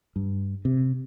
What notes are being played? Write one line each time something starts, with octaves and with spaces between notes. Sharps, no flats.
G2
C3